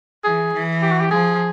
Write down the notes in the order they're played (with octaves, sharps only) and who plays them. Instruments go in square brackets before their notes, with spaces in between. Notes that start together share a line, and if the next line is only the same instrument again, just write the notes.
[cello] E3 [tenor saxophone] G#4
[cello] E3
[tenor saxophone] G4
F#4
G4
[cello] F3 [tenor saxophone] G#4